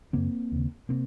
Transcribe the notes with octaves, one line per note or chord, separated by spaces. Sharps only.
F#2 C#3 A#3 C4
D#2 C#3
C3 A#3 C4